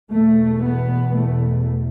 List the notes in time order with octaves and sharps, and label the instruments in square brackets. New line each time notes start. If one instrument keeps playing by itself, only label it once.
[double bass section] E2 B2 A3
B3
A3